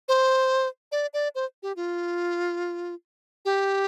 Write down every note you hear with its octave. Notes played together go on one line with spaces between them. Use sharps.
C5
D5
D5
C5
G4
F4
G4